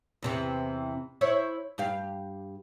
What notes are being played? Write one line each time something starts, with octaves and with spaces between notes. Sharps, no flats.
E2 C3 E3
E4 C5 C#5
G2 G4 F5